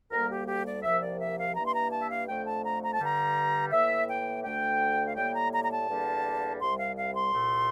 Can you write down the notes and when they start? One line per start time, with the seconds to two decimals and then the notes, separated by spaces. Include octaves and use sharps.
0.11 D2 D3 G3 A#3 A#4
0.29 G4
0.47 G4
0.66 D5
0.83 C2 C3 F3 A#3 E5
1.01 D5
1.19 E5
1.38 F5
1.55 G2 E3 A#3 A#5
1.65 C6
1.73 A#5
1.91 A5
2.03 E5
2.10 F5
2.28 F2 D3 A3 G5
2.46 A5
2.64 A#5
2.82 A#5
2.93 A5
3.00 G2 D3 G3 A#5
3.72 A2 E3 A#3 E5
4.09 G5
4.44 D2 D3 A3 G5
5.06 F5
5.16 A2 G3 A#3 G5
5.34 A#5
5.53 A#5
5.64 A#5
5.70 A5
5.89 E2 D3 G3 A#3
6.61 C2 C3 G3 C6
6.79 F5
6.97 F5
7.15 C6
7.33 C2 A#2 A3